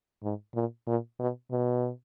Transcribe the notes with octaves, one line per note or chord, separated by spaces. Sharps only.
G#2
A#2
A#2
B2
B2